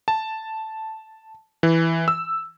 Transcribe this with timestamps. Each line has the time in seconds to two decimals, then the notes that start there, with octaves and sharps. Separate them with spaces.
0.08 A5
1.63 E3
2.08 E6